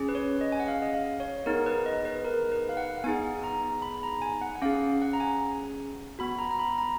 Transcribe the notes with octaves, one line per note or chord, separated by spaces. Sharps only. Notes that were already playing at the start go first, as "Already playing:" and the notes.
Already playing: C#4 G#4
B4
C#5
D#5
G#5
F#5
F5
D#5
F5
C#5
B3 D#4 G#4 A#4
B4
D#5
B4
A#4
B4
F5
F#5
B3 D#4 G#4 G#5
A#5
B5
A#5
G#5
F#5
F#5
C#4 G#4 F5
F#5
A#5
G#5
B3 F#4 B5
A#5
A#5
B5
A#5